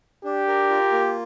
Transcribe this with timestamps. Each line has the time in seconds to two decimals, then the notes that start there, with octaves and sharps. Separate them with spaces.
0.24 D4 G4
0.47 A#4
0.70 F4
0.92 A#3